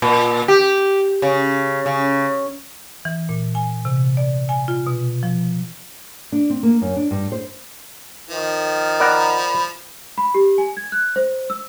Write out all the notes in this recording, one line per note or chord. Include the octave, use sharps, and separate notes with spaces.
A#2
G4
C#3
C#3
E3
A#2
G#5
C3
D5
G#5
F4
B2
F3
D4
C4
A#3
F#2
D4
G2
C5
D#3 F3
A#4 D5 F#5 B5
B5
G4
G#5
G#6
F#6
C5
E6